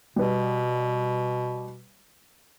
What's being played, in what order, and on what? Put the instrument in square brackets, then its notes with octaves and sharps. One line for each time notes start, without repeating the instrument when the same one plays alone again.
[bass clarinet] B2 [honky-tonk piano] G3 B4